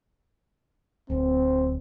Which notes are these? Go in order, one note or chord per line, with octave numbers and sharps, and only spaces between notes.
D1 C4